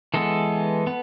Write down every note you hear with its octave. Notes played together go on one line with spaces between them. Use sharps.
E3 G#3 B3 A4
B3